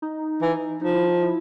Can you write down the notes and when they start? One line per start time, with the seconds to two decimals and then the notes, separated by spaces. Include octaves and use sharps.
0.02 D#4
0.42 E3
0.81 F3 D#4
0.94 E4
1.07 D#4
1.23 E4